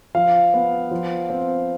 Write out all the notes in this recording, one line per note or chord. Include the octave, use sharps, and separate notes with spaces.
F3 F5
B3
F3
C4